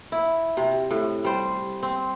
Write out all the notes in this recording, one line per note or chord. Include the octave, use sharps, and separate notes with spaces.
E4
C3
A2
G3 C5
C4